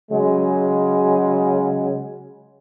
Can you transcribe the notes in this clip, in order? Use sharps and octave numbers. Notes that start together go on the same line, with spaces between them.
C#3 F#3 G#3